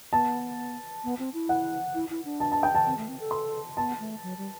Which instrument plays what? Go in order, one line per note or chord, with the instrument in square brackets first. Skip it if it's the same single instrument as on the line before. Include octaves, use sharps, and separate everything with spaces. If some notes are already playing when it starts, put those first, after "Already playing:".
[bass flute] B3 [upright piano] A5
[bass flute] B3
C4
E4
[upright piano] F#5
[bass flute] E4
E4
D4
[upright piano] A5
A5
G5
A5
[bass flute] C4
A3
C4
A4
[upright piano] C6
[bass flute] B3 [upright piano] A5
[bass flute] A3
F#3
G3